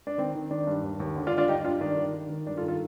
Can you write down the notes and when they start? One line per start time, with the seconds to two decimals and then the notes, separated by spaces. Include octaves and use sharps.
0.07 D4
0.18 D#3 C4
0.35 D#3
0.51 D#3 D4
0.67 G2
0.83 D#2
1.00 D#2
1.16 D3
1.27 D4 F4
1.33 D3
1.38 D4 F4
1.48 G2 D#4 G4
1.64 G2 D4 F4
1.81 D#3 D4
1.97 D#3
2.14 D#3
2.30 D#3
2.47 G2 D4
2.57 F4 A4
2.63 D#3
2.68 F4 A4